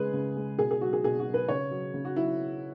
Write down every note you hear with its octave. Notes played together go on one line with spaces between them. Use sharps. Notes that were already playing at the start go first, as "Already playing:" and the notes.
Already playing: C#3 G#3 G#4 B4
C#3
G#3
B2 G#4
G#4
F#3 F#4
G#4
B2 G#4
F#4
F#3
B4
C#3 C#5
F#3
C#3
F#4
F#3 E4